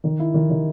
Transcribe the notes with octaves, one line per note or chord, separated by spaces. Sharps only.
D#3
E4
D#3
D#3